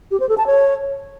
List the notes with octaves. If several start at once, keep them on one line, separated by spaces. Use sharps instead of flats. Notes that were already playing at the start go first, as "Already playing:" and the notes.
G4
C5
A4
A5
C#5